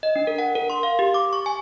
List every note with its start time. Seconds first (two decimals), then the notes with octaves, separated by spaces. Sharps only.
0.03 D#5
0.16 D4
0.27 A#4
0.38 F#5
0.55 A#4
0.70 C6
0.83 F5
0.99 G4
1.14 D6
1.33 C#6
1.46 G#5